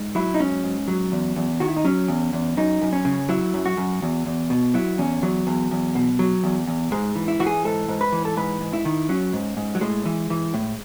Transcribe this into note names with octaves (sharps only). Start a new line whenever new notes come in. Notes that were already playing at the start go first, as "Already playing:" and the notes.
Already playing: G#2
F#3 E4
D#4
G#2 C#4
G#2
F#3
E2
E2
D#3 F#4
E4
D#4
F#3 C#4
E2
E2
F#2 D#4
F#2
C#4
C#3
F#3 E4
F#2
F#4
F#2
E2
E2
B2
F#3 E4
E2 C#4
E2 F#3
E2
E2
B2
F#3
E2
E2
G#2 G#3
E3
E4
E3 F#4
G#4
G#2 A4
G#2
B4
E3
A4
G#2 B4
G#2
E4
D#3
F#3 C#4
G#2
G#2
F#3
A2 G#3
E3
E3
A2